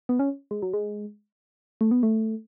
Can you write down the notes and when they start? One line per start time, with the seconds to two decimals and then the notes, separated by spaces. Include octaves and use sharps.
0.09 B3
0.19 C#4
0.51 G#3
0.62 F#3
0.73 G#3
1.81 A3
1.91 B3
2.03 A3